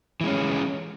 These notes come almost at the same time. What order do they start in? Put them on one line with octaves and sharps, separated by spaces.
E3 G#3 C#4